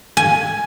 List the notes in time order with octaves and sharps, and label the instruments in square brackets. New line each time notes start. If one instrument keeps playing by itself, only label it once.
[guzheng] G#5